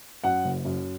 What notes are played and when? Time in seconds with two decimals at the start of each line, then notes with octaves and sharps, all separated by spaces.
0.24 F#2 F#5
0.45 F#1
0.65 F#2